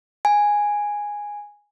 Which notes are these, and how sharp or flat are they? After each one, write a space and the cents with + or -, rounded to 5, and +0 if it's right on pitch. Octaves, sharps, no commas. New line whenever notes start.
G#5 -5